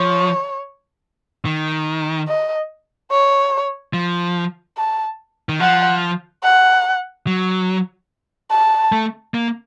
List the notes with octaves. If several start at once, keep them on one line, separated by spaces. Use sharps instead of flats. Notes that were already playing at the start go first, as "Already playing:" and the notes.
Already playing: F3 C#5
D#3
D#5
C#5
F3
A5
D#3
F3 F#5
F#5
F#3
A5
A3
A#3